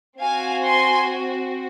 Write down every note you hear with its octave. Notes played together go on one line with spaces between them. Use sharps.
C4 F#4 F5 G#5
G#5 C6